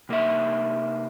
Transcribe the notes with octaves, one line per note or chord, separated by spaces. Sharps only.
C3 A#3 D#4 E5